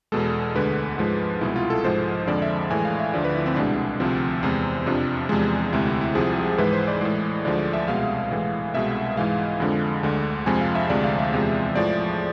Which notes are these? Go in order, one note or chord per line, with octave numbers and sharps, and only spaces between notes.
E2 B2 G#3 A4
D2 D3 G#3 B4
G#2 F3 G#3
C2 B2 G#3 E4
F4
A4
G#2 F3 G#3 C5
F2 D3 F3 G#3 D5
E5
A2 E3 G#3 G#5
F5
E5
D2 D3 F3 D5
B4
E4
C4
C2 B2 G#3 D4
D2 C3 F3 C4
E2 C3 G#3
F2 C3 F3 D4
E2 C3 F3 G#3
D2 C3 G#3 E4
E4
E4
C2 C3 F3 G#4
G#2 E3 G#3 B4
C5
D5
A2 E3 G#3
D2 D3 F3 G#3 D5
D5
E5
C2 B2 G#3 F5
A2 E3 G#3
C2 B2 G#3 E5
G#2 E3 G#3 F5
F2 D3 F3 G#3
D2 D3 G#3
F2 C3 F3 G#3 G#5
F5
E5
D2 C3 F3 G#3 D5
F5
E5
E2 C3 F3 G#3
A2 F3 G#3 D5